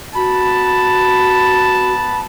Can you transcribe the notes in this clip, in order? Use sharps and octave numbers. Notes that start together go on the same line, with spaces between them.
B3 F#4 A5 B5